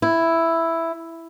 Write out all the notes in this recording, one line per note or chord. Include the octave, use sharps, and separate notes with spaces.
E4